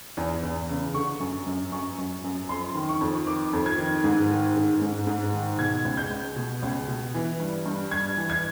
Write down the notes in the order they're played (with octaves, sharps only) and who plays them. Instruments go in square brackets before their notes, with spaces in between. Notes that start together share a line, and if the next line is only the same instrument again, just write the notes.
[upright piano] E2
E2
C#3
D3 C#6
F#2
F#2
F#2 C#6
F#2
F#2
F2 C6
D#3
C#6
F2
D#3 D6
F2
G#6
D#3
G#2
D#3
G#2
G#2
G#2
D#3
B2 G#6
C#2
G6
C#2
B2
C#2
B2
E3
G2
G2
G2 G#6
E3
G#6